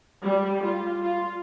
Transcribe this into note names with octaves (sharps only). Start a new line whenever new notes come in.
G3
F4
F4